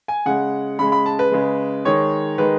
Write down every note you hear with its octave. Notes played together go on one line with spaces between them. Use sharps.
G#5
C#3 G#3 F#5
C#3 G#3 B5
B5
A5
B4
C#3 G#3
D#3 G#3 C#5
D#3 G#3 B4